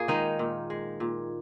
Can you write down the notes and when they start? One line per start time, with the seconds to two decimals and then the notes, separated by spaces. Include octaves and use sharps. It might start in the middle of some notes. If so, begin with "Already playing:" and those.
Already playing: A#2 A#3 G#4
0.08 D#3 G#3 D#4
0.39 A#2
0.70 G#3
1.00 A#2